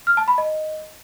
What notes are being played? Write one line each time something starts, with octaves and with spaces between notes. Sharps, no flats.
F6
A5
B5
D#5